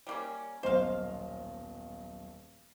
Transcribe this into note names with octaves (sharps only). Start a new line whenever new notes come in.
G3 A#3 C#4
D#1 B1 C5 D#5 F5